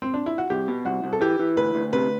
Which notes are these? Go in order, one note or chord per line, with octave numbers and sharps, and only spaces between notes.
C4
D4
E4
F#4
C2 G4
B2
C2 F#4
C2
A4
E3 G4
E3
D2 B4
D2
C3 B4